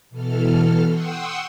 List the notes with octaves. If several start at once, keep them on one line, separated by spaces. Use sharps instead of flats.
B2 E3 A4 F6
F#5 G5 C6 C#6 D#6 E6